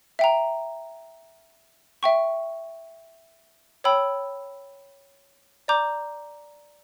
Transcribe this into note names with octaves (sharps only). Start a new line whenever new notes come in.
E5 G5 A#5
E5 G5 C#6
C#5 G5 B5 E6
D5 A#5 D6 G6